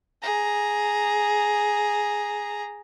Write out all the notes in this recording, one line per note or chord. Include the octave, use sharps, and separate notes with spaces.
G#4 A#5